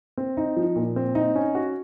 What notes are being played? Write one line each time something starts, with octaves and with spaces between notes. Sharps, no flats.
C4
D#4
F3
A#2
C4
D#4
C#4
F#4